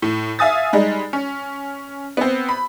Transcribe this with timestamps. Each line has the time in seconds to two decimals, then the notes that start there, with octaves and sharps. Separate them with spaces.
0.02 A2
0.39 E5 F5 G#5 D#6 A6
0.73 G3 G#3 D#4
1.13 C#4
2.17 B3 C4
2.49 B5